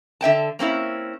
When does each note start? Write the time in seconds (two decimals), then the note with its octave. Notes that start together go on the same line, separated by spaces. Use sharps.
0.21 D3 E5 G5 A5
0.59 A#3 C4 C#4 E4